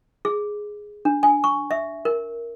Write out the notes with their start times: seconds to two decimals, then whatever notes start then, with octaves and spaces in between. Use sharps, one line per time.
0.25 G#4
1.05 D4
1.23 G#5
1.44 C#6
1.71 E5
2.05 A#4